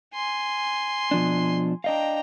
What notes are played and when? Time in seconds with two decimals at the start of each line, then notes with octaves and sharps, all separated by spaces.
0.14 G#5 C6
1.11 B2 F3 D4
1.84 D4 D#5 F5 G5 A#5